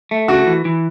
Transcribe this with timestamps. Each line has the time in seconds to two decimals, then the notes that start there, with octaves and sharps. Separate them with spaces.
0.11 A3
0.28 C#3 F#4
0.46 E3
0.65 E3